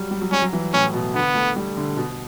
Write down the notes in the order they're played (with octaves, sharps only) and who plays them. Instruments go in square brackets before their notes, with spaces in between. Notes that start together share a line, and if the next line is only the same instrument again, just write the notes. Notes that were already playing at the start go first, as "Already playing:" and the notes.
Already playing: [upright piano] F#3 G3
G3
F#3
[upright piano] G3 [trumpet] C#4
[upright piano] F#3
E3
[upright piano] A2 [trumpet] C#4
[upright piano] B2
[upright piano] D3 [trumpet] B3
[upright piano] A3
G3
D3
B2